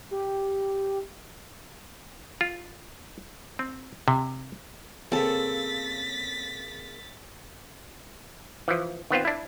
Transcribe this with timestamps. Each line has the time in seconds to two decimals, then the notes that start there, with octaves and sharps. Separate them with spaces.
0.11 G4
2.41 F4
3.59 C4
4.08 C3
5.12 C#3 A#3 C4 A4 A6 B6
8.68 E3 F3
9.10 D#3 B3 C4 F4
9.25 D4 E4